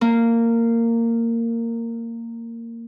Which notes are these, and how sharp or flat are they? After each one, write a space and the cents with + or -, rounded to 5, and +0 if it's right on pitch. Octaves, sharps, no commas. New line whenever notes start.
A#3 -15